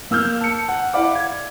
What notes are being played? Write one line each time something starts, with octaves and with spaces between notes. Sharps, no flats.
A#3 E6 F6 G6
A5 C#7
F#5
E4 D5 F5 F#5 B5 D6
G#6